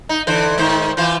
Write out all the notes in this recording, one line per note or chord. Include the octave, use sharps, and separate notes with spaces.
D#4
D3 E3 C5
G#2 D#3 C5
E3 F4 C5